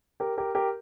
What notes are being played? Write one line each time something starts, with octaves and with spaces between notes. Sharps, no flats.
G4 A#4
G4 A#4
G4 A#4